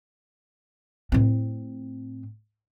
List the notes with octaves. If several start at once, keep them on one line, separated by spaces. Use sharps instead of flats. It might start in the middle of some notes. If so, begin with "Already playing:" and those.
A2 C4